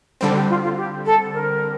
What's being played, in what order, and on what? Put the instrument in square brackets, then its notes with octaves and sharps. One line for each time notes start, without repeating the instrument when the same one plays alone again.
[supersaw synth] D3 G3 C4 [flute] A4
[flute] G4
F4
F4
G4
A4
A#4